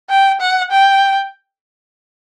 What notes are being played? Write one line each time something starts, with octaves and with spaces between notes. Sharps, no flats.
G5
F#5
G5